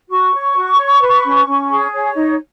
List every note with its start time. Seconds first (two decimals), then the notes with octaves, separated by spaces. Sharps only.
0.09 F#4 C#6
0.33 C#5
0.56 F#4
0.78 C#5
1.00 B4
1.24 C#4
1.46 C#4
1.69 G#4
1.92 C#5
2.15 D#4